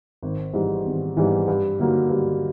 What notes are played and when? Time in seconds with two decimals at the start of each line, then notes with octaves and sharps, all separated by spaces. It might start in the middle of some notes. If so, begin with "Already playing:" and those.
0.23 G#1
0.54 G#2 E3 G3
0.86 G#1
1.17 G#2 E3 G3
1.48 G2
1.79 D3 F#3 A#3 D#4
2.10 G2